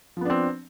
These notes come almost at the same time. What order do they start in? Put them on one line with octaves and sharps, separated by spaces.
F3 B3 D4 C4